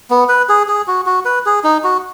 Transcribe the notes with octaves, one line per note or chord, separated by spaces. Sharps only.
B3
B4
G#4
G#4
F#4
F#4
B4
G#4
D#4
F#4